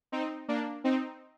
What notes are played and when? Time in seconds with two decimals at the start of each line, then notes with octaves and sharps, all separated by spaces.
0.12 C4 D#4
0.48 A#3 D4
0.84 C4 D#4